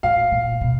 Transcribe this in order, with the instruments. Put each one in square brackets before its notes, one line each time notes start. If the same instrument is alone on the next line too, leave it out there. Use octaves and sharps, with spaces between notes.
[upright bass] A2 [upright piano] F5
[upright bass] A#2
B2